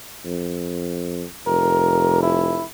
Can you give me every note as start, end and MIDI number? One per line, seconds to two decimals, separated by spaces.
0.25 1.25 41
1.47 2.61 29
1.47 2.19 70
2.22 2.64 64